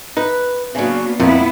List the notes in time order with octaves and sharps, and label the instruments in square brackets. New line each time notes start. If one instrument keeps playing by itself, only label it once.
[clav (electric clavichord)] D#4 [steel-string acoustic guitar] B4
[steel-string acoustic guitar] C#3 F#3 [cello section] A#3 B3 D4
[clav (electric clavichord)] F2 A#2 [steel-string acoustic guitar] D#3 [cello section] B3 E4